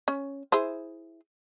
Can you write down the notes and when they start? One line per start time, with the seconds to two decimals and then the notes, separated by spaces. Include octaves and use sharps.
0.08 C#4
0.52 E4 G#4 C5